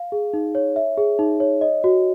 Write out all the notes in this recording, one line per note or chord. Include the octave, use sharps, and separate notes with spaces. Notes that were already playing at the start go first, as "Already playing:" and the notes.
Already playing: F5
G#4
D#4
C#5
E5
G#4
D#4
C#5
D#5
F#4